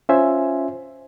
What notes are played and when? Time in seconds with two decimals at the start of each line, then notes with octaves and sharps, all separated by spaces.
0.09 C#4 F4 C5 E5 G#5